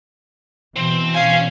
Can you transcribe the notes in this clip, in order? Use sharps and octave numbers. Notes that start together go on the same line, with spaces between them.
B2 E3 C4
C#4 F5 G#5